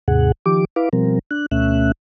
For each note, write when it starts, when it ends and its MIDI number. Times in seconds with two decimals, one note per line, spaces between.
0.08 0.32 39
0.08 0.32 44
0.08 0.32 48
0.08 0.32 68
0.08 0.32 78
0.46 0.65 51
0.46 0.65 53
0.46 0.65 67
0.46 0.65 86
0.76 0.89 64
0.76 0.89 71
0.76 0.89 77
0.76 0.89 86
0.93 1.19 47
0.93 1.19 53
0.93 1.19 55
0.93 1.19 60
0.93 1.19 70
1.31 1.46 62
1.31 1.46 90
1.51 1.92 38
1.51 1.92 47
1.51 1.92 57
1.51 1.92 61
1.51 1.92 76
1.51 1.92 90